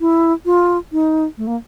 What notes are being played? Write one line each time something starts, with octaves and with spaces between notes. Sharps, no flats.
E4
F4
D#4
A3
A#3